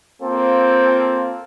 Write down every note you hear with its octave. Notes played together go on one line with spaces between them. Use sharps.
A#3 C4 F4 A4 C5